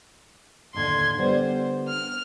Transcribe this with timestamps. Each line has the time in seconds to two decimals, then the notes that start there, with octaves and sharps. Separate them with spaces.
0.74 D#2 A2 D3 C6 G#6
1.18 D3 G3 B3 C5
1.88 F6